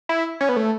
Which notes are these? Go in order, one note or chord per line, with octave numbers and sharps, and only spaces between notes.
E4
C#4
B3
A3